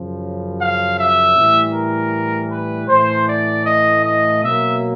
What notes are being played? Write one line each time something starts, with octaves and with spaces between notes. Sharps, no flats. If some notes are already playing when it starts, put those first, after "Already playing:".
Already playing: F#2 C#3 F3
F5
E5
A2 E3 G3
A#4
B4
A2 E3 A3 C5
D5
D#5
D#5
B2 F#3 A#3 E5